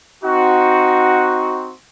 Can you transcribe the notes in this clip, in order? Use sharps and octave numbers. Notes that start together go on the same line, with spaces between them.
C4 D#4 F#4